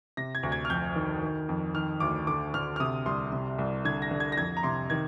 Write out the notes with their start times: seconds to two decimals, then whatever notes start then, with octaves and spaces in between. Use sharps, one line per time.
0.17 C3 A#6
0.35 G#6
0.43 D2
0.52 G#6
0.65 F6
0.70 F2 G6
0.96 D#3
1.22 D#3
1.49 F2
1.74 D#3 F6
2.00 D2 D6
2.27 D3 D6
2.54 D3 F6
2.76 F6
2.80 C3 D#6
3.06 C2 C6
3.32 C3
3.58 C2
3.85 D3 G#6
4.02 A#6
4.11 D3
4.20 G#6
4.32 A#6
4.37 F2 G#6
4.57 A#5
4.63 C3 C6
4.90 D#3 G#6